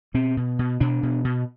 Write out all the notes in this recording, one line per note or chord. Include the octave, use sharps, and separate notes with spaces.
B2 C4
B2
B2
B2 D4
B2
B2